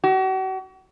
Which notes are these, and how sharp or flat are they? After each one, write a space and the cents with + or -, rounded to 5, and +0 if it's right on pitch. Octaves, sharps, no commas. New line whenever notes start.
F#4 +40